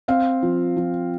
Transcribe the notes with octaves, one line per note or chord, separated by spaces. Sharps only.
C4 F5
F3
F3